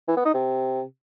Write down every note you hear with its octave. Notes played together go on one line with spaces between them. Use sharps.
E3
B3
D#4
C3